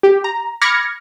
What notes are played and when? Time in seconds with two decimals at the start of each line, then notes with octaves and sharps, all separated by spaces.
0.03 G4
0.24 A#5
0.61 B5 D6 F6 G#6 A#6 C#7